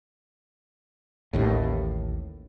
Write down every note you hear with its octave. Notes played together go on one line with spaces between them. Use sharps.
A1 D#2 A2